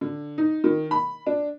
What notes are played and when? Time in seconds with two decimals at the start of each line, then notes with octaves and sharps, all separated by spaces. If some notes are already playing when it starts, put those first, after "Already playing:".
0.01 D3
0.38 D#4
0.64 D#3
0.91 B5
1.27 D4